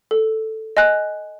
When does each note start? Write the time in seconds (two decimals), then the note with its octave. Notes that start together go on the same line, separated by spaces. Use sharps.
0.11 A4
0.77 D#5 G#5 F#6